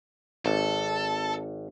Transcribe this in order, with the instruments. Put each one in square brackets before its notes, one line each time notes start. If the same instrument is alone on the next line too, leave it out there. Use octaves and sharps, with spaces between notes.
[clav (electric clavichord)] G#1 [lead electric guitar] A4